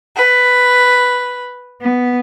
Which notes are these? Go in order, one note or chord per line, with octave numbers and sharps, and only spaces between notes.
B4
B3